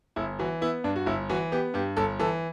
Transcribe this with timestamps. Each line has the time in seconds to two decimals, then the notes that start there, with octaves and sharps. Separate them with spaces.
0.16 G1 E4
0.39 E3 F#4
0.61 B3 E4
0.84 G2 D4
0.96 F#4
1.06 G1 E4
1.29 E3 F#4
1.52 B3 G4
1.74 G2 G4
1.97 G1 A4
2.20 E3 A4